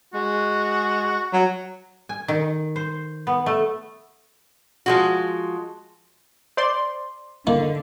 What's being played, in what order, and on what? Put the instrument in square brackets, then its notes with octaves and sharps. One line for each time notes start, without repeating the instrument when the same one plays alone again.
[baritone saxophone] G#3 [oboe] F#4
[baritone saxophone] F#3
[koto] G#5
D#3
C5
B3
A3
[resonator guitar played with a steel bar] F3 G#3 F#4
[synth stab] C5 D5 C6
[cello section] D3 [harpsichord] D#3 A#3